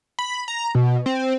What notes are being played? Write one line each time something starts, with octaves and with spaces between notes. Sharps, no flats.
B5
A#5
B2
C4